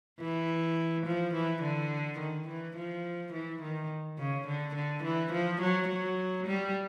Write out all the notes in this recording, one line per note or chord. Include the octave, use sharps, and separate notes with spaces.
E3
F3
E3
D3
D#3
E3
F3
E3
D#3
C#3
D3
D3
E3
F3
F#3
F#3
G3